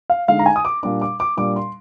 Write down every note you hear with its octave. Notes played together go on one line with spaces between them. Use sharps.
F5
D3 G#3 D#4 F5
A#5
G#5
D#6
D6
A#2 G3 D4 D6
D6
D6
A#2 G3 D4 D6
C6